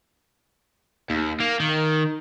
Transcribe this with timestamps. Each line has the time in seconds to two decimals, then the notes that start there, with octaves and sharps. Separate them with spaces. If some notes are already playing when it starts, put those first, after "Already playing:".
1.10 D#2
1.40 A#3
1.60 D#3